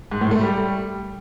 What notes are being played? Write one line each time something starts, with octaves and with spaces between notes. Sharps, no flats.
G#2
A2
A3
G3